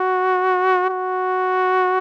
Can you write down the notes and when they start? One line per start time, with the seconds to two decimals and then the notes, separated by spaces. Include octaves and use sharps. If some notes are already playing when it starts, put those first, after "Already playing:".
Already playing: F#4
0.89 F#4